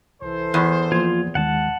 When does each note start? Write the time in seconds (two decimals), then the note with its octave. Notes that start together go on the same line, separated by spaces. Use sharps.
0.22 C2 E3 A4 C5
0.54 E2
0.92 F3 A#3 F4 G#6
1.35 D#2 D#3 G#3 F#5 A5